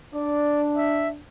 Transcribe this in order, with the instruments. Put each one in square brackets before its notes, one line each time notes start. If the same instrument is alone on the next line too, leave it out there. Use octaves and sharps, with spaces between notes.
[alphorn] D4 [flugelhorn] D5
[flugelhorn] E5